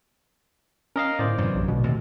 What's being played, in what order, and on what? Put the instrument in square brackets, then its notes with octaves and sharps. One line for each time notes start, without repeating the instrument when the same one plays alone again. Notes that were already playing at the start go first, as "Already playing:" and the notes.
[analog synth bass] C#4 [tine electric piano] A#4 D#5 F5
[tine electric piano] G1 C5 D5 [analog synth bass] A2
[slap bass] F#2 C3 E3
[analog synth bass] A#1
[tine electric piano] A1 D2 [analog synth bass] B2
[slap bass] D#2 C3